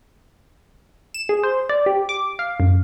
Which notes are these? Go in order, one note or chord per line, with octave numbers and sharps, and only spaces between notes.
E7
G#4
C5
D5
G4
D6
F5
F#2